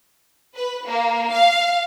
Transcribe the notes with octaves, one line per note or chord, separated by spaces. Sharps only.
B4
A#3
F5